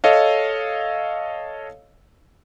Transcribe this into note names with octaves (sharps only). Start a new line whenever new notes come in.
A4 C#5 D#5 F5